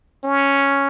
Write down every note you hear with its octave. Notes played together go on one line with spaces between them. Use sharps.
C#4